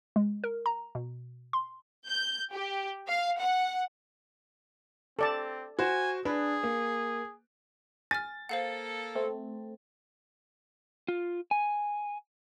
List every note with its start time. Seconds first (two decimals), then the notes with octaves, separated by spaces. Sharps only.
0.16 G#3
0.44 A#4
0.66 A#5
0.95 B2
1.53 C6
2.06 G6
2.52 G4
3.07 F5
3.39 F#5
5.19 C4 A4 D5 A5
5.79 F#4 C5 G#5
6.25 D4 G#4 B4
6.63 A#3
8.11 G#5 F6 A6
8.49 A#3 A4 C5 F5 F#5
9.15 A3 C4
11.08 F4
11.51 G#5